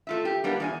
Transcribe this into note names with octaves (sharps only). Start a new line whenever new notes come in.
A3 F4 E5
G4
G3 A#3 B3 D4
E2 F4 G#5